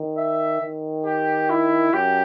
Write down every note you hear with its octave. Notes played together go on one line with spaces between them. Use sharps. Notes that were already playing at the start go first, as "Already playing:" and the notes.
Already playing: D#3
E5
D#3
G4
E4
F#2 G4